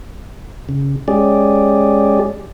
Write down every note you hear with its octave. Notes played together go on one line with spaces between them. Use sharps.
C#3
G#3 C#4 G4 G#4 D5